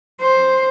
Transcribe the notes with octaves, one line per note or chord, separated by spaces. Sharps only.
C5